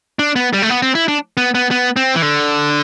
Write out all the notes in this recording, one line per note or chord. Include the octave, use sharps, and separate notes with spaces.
D4
B3
G3
A3
B3
C4
E4
D4
B3
B3
B3
C4
E3
D3